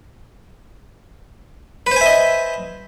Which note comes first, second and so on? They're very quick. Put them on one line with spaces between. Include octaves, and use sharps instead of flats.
B4 C5 G#5 E5 D#5